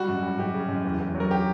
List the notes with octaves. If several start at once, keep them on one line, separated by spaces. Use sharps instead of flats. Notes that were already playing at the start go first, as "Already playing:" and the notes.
Already playing: G3 F#4
F#2
G3
F#2 G4
C#3
F#2
E2
E2
F#3
A#4
G4